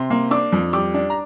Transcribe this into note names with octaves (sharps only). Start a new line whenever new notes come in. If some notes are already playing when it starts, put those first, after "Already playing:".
Already playing: C3 C6
A#3
D4 D6
F2
G3 D6
D4
A#5